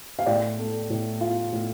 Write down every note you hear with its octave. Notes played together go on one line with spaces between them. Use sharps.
F5
A2 D5 G5
A3
A2
F4
A2